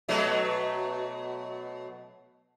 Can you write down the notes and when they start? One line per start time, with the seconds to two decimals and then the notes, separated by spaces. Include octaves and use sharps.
0.08 B2 F#3 A3